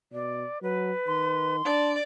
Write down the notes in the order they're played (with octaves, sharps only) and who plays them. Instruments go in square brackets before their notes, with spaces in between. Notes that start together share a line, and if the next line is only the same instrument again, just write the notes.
[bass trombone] B2 [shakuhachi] D5
[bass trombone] F#3 [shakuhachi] B4
[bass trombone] D#3 [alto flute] C6
[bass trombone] D4 [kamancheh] D5 [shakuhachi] A5